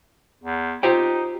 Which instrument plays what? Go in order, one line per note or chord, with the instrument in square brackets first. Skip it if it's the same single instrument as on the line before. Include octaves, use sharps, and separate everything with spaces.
[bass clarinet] E2
[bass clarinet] D#4 [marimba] F4 [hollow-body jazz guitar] G4 C5 G5